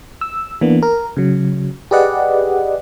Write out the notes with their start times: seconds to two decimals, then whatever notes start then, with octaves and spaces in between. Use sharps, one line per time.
0.21 E6
0.61 E3 A#3 B3 D4
0.82 A#4
1.17 C#3 F#3
1.91 G4 G#4 B4 D5 D#5 F#5